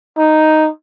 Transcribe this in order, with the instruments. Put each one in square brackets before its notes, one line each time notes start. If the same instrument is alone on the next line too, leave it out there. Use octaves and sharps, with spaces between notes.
[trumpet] D#4